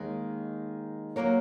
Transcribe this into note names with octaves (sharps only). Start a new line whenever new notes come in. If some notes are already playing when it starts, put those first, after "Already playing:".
Already playing: D#2 D#3 G#3
F#3 A#3 F#4 A#4 C#5